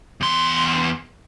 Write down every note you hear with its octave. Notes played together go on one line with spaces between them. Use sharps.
E2 C6